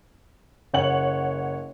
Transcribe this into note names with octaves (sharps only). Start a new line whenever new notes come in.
F#1 C#5 F#5 F#7